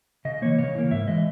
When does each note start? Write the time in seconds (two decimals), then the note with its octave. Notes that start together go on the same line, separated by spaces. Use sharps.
0.25 C#3 D#5
0.42 E3 A#3 C#5
0.58 C#3 C#5
0.75 E3 A#3
0.91 G#2 E5
1.08 E3 G#3 D#5